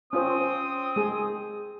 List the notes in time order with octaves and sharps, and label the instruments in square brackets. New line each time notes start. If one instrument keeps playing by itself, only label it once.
[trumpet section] C4 D#6 [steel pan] C#4 F4 C5
[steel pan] G#3 G#4